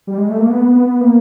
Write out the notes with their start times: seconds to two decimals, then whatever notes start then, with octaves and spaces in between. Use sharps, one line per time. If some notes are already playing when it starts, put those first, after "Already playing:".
0.07 G3
0.18 G#3
0.29 A3
0.40 A#3
0.50 B3
0.75 B3
1.01 A#3